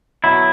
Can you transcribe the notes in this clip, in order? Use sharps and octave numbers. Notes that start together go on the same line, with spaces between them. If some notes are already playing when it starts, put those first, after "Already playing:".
B2 F#3 E4